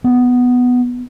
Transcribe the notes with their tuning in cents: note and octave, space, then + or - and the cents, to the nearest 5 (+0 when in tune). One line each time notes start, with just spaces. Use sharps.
B3 +5